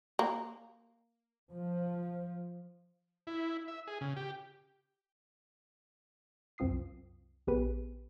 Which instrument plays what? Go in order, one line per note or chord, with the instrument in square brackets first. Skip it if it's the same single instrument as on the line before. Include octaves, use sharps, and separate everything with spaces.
[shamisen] A#3
[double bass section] F3
[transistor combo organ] E4
E5
G#4
C#3
G4
[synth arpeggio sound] C2 F#2 C4 F4 D#6 C7
A#1 B3 G4 G#4 B4 D#7